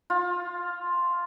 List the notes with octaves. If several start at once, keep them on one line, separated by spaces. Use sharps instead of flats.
F4